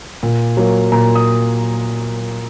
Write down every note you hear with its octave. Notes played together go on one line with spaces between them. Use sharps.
A#2
F#3 A#3
A#2 A#5
D#6